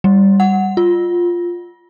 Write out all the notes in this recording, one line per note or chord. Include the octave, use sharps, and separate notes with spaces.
G3
F#5
F4